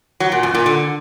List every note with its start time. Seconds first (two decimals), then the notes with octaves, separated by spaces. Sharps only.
0.20 F#3
0.32 A#2
0.43 F#2
0.55 A#2
0.66 D3